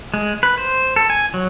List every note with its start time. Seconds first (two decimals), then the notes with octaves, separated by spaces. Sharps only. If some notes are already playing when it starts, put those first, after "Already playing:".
0.14 G#3
0.43 B4
0.58 C5
0.96 A4
1.10 G#5
1.34 F#3